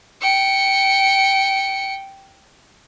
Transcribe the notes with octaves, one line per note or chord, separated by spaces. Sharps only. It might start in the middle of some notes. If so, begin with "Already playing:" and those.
G5 C#7